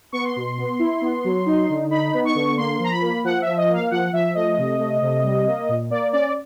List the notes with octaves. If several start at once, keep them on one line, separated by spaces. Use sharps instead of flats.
B3 C#6
C6
B2
B3
E4
B3
F#3
D#4
D3
D#4 B5
B3
C#6
D3
A#3 C6
F3 A#5
B5
A#3
F3 F#5
F3 E5
D#5
A#3 F5
F3 F#5
F3 E5
A3 D#5
C3
A3
C3
G3
A#3
A#2
A#3 D5
C#4 D5